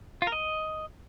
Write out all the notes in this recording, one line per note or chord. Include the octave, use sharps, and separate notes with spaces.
F4
A#4
D#5